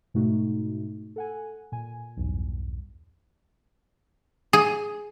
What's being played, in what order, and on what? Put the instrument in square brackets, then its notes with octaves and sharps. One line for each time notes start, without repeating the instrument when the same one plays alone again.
[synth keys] G#2 B2 A3 D#4 F#4
A4 F#5 G#5
A#2 G#5
B1 E2 G2
[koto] G#4